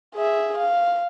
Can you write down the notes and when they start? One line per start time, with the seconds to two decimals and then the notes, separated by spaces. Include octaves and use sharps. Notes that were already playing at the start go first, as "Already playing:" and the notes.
0.15 G#4 E5
0.58 F5